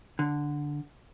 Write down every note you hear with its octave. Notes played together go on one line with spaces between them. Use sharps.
D3